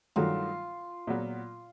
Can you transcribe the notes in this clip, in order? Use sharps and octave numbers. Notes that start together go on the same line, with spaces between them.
G2 D#3 F#3 A3 F4
A#2 F#3 B3